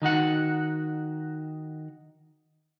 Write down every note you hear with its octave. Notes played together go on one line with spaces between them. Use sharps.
D#3 D#4 F#4 F#5